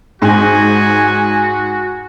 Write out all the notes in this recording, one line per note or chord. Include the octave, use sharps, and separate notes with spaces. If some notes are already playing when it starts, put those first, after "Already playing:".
G#2 F#4 G#5